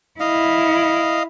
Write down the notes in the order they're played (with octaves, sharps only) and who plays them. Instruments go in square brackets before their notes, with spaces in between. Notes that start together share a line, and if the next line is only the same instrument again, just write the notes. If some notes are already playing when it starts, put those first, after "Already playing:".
[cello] E4 [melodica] D#5 F5